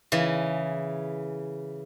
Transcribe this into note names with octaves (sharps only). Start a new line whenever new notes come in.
C#3 E3